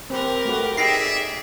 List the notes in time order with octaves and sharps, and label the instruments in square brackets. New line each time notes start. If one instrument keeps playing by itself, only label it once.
[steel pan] C4 B4 [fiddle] G4 A#4
[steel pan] A3 F#4 B4
[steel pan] D#4 [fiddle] G#4 [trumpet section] D5 E5 [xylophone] G5 A#6 C7